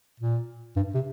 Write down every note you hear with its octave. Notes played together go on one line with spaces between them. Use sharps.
A#2
G2
C3